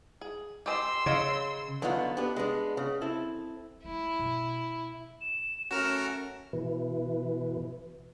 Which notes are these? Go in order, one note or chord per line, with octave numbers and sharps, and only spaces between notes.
G#4
G4 D#5 C6 E6
C#3 C#5 D#5 F5
D3 D#3 F#3 B3 F4
B3 D4 G4 B4
G#3 B3 D4
C#3
C4 E4 A4
A3 E4
B2
E7
F#2 A3 C#4 F#4 A#4 F6
B2 E3